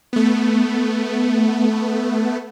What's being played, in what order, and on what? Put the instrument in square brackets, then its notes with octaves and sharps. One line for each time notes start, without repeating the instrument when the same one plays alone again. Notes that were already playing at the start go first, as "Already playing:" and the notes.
[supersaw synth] A3 B3